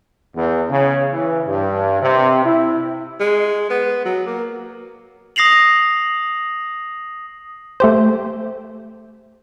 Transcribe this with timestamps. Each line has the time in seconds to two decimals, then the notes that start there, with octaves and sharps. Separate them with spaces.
0.35 E2
0.70 C#3
1.11 E3
1.46 G2
2.01 C3
2.44 E4
3.20 G#3
3.70 B3
4.05 F#3
4.27 A#3
5.36 D#6 A#6 C7 F7 F#7
7.80 A3 G4 C5